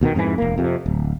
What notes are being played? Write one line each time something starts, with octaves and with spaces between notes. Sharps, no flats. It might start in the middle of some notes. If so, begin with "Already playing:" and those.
D#2 B2 D3 D#3
F2 G#2 C#3 E3
E1 A#3
F2 C3
D1